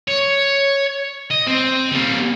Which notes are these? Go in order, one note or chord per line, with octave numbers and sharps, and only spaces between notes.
C#5
D#5
C4
G3 A#3